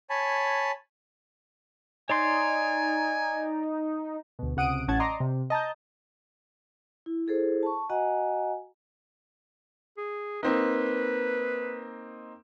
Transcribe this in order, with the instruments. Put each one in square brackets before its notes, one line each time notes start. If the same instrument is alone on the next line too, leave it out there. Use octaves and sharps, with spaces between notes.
[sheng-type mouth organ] C#5 G#5 A5 B5
[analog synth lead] D#4 [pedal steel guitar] C#5 D5 C6 [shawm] G#5
[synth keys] D2 B2
C#2 C3 F#5 D#6 D7 D#7
A1 C#4 F#5 A5 G#6
D5 D#5 A#5 C6 D6
C3
D#5 A5 A#5 G6
[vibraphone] E4
E4 G#4 A4 C5
A5 C#6
F#4 D#5 F#5 G#5 A#5
[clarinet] G#4
[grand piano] A#3 C4 D#4 [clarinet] B4